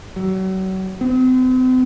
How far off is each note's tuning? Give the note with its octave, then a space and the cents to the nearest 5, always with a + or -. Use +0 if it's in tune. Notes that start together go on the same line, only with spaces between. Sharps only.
F#3 +35
C4 -40